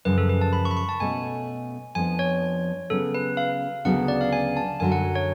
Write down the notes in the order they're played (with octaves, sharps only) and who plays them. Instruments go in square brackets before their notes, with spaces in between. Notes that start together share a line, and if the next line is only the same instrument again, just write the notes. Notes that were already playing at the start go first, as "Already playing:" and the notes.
[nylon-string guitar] F#2 C#3 F3 [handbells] B4
[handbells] A4
B4
A5
B5
C#6
B5
C#6
A5
[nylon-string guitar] B2 A3 C#4 [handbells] G#5
[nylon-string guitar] F2 F3 G#3 B3 D4 [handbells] G#5
[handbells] C#5
[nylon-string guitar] C#3 F#3 B3 [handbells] A4
[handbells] B4
F5
[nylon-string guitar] D2 C#3 F#3 B3 D4 [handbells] F#5
[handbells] D5
F5
G#5
A5
[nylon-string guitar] F#2 D3 F#3 [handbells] G#5
[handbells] F#5
C#5